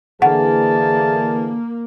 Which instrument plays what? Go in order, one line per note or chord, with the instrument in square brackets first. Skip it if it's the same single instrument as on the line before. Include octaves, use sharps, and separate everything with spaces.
[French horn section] D3 E3 G#4 [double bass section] A#3 [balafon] F#5 [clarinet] A5